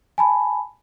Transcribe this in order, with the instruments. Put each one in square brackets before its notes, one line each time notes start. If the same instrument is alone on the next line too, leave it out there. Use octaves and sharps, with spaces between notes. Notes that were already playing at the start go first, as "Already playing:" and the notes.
[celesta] G#5 A5 B5